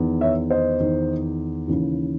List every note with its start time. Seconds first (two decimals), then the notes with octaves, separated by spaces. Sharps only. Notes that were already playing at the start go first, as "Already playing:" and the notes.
Already playing: E2 D#3
0.21 C#5 E5
0.50 C5 D#5
0.80 E2 D#3
1.68 D#2 C#3 E3